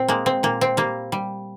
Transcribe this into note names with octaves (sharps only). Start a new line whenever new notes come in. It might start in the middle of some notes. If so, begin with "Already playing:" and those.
Already playing: A#2 C4
G#3 A#3
C4
A#2 A#3
C4
G3 A#3
G3